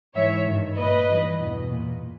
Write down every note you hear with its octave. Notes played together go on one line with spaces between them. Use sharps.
G#2 E3 C#5 E5
G2 D#3
A#2 B4 D#5
G2 E3
E2 B2
A#2